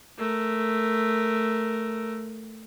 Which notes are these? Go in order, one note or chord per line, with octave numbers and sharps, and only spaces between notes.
A3 A#4